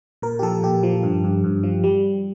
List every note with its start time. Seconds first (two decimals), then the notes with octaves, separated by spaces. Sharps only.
0.22 A#2 A#4
0.39 G4
0.42 F3 A4
0.63 A#2 G4
0.83 F3
1.03 G2
1.24 G2
1.44 G2
1.63 F3
1.84 G3